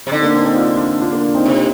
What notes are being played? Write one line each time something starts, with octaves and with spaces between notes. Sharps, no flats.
C3
D3 C4 D#4
A#3 D4
C4 D#4
C4 D#4
F4
D4 F4
D4 F4
A#3 D4
D4 F4
C4 D#4
C3